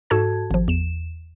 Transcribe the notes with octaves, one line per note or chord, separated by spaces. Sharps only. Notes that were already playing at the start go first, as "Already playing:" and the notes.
G#2 F#4 A4 A5 G#6
G#1 F3
E2 E7